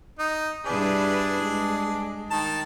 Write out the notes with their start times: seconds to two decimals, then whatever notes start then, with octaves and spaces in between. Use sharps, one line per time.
0.19 D#4
0.66 G2 D4 E4 G#4 B4 D5
1.41 G#3
2.31 D#3 A5